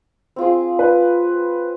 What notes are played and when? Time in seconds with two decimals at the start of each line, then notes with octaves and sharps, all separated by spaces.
0.36 C4 F4 G#4
0.79 B4